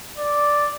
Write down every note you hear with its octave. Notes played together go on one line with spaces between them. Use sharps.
D5